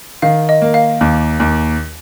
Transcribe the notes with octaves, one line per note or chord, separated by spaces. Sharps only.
D#3 F5
D#5
A#3
F5
D#2
D#2